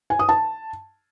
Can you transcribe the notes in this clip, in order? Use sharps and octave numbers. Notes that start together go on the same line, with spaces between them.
G#5
D#6
A5